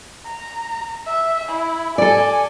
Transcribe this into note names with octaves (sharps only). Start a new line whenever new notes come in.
A#5
E5
E4
A4 D5 G#5